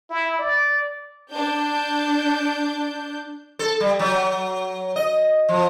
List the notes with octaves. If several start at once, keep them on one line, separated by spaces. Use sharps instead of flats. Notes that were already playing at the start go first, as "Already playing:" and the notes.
E4
D5
D4 G6
A4
G3
F#3
D#5
F3